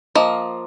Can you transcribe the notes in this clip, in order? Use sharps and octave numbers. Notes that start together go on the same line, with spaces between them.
F3 A#3 D#5